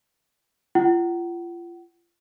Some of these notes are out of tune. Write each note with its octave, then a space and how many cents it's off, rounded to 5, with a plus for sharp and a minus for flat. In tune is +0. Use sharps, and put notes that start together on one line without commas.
F4 -30 F#5 +35